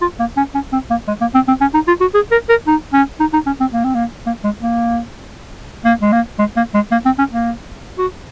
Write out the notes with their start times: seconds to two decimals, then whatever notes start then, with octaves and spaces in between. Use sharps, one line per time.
0.01 F4
0.19 A#3
0.37 C#4
0.55 C#4
0.73 C4
0.90 A#3
1.08 G#3
1.21 A#3
1.35 C4
1.48 C4
1.61 C#4
1.74 D#4
1.88 F4
2.01 F#4
2.14 G#4
2.31 A#4
2.49 A#4
2.67 D#4
2.93 C#4
3.20 D#4
3.33 D#4
3.46 C#4
3.60 C4
3.73 A#3
3.84 C4
3.94 A#3
4.26 A#3
4.44 G#3
4.62 A#3
5.85 A#3
6.02 G#3
6.12 A#3
6.39 G#3
6.56 A#3
6.74 G#3
6.92 A#3
7.05 C4
7.19 C#4
7.32 A#3
7.98 F#4